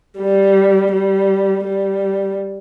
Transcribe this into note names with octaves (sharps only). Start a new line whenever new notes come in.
G3
G3
G3